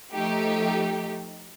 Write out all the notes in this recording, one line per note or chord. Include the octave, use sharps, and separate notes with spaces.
F3 A3 D#4 G4